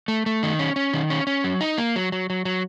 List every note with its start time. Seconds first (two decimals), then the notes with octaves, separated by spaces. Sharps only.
0.08 A3
0.26 A3
0.43 D#3
0.59 C#4
0.76 C#4
0.94 D#3
1.10 C#4
1.27 C#4
1.44 F#3
1.61 D#4
1.78 A#3
1.96 F#3
2.12 F#3
2.30 F#3
2.45 F#3